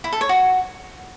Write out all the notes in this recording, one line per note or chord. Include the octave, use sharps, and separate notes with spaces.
E4
A4
C#5
F#4